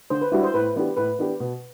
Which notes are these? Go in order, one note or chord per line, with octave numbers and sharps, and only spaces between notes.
D3 C5
B4
G3 D4 E4 F#4
C5
A2 B4
E3 B3 D4 G4
A2 B4
E3 B3 D4 G4
B2